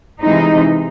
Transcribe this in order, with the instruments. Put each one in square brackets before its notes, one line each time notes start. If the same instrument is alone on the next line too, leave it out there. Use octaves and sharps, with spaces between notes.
[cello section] C3 E3 G#3 C4 D#4